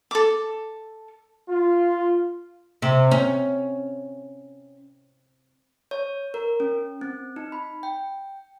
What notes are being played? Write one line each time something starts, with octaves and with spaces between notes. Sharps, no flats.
A4 D6
F4
C3
C#4
C#5
A#4
C#4
C4
D#4
B5
G5